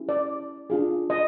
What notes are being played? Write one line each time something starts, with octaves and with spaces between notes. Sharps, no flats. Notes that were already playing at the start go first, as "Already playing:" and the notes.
Already playing: C#4 E4 G4
D5
D4 F4 G#4
D#5